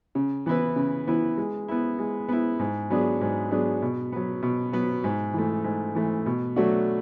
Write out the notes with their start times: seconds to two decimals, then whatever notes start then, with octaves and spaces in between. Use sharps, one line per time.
0.15 C#3
0.46 E3 B3 E4 B4
0.76 C#3
1.07 E3 B3 E4 B4
1.38 G#3
1.68 B3 E4
1.99 G#3
2.28 B3 E4
2.59 G#2
2.90 F#3 B3 D4 G#4
3.21 G#2
3.51 F#3 B3 D4 G#4
3.82 B2
4.12 F#3 B3
4.43 B2
4.73 F#3 B3
5.04 G#2
5.34 E3 A3
5.64 G#2
5.95 E3 A3
6.26 B2
6.56 F#3 A3 D4 F#4